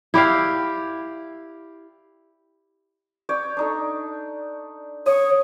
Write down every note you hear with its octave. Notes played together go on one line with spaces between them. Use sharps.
E4 G4 D5 F5
C#5 D5 G5
D4 D#4 A4
C#5 D#6